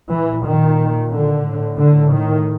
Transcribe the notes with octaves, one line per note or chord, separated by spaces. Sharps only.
A#2 E3
D#3
D3
A2
D3
D#3